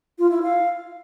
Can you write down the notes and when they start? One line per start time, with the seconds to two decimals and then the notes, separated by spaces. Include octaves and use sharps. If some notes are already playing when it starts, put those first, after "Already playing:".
0.19 F4
0.31 E4
0.43 F5